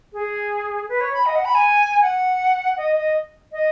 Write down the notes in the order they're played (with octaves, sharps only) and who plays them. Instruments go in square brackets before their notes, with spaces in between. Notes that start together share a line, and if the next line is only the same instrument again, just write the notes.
[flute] G#4
B4
C#5
B5
D#5
F#5
B5
G#5
F#5
D#5
D#5
D#5